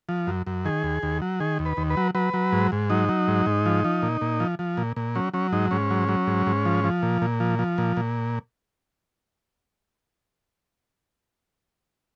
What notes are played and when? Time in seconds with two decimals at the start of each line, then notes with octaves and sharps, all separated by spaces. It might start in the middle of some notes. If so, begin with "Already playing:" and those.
0.09 F3
0.27 F#2
0.47 F#2
0.65 D#3 G#4
0.84 D#2
1.03 D#2
1.22 F#3
1.40 D#3 G#4
1.59 D#2
1.65 B4
1.77 D#2
1.90 B4
1.97 F#3
2.15 F#3 B4
2.34 F#3
2.53 G#2
2.72 G#2
2.90 F#3 D#4
3.09 F#3
3.28 G#2
3.46 G#2
3.66 F3
3.85 F3
4.02 A#2
4.21 A#2
4.40 F3
4.59 F3
4.77 A#2
4.96 A#2
5.15 F#3 C#4
5.33 F#3 C#4
5.52 G#2 D#4
5.71 G#2 C#4
5.91 F#3
6.08 F#3
6.27 G#2
6.47 G#2
6.65 F3
6.84 F3
7.02 A#2
7.22 A#2
7.40 F3
7.59 F3
7.78 A#2
7.97 A#2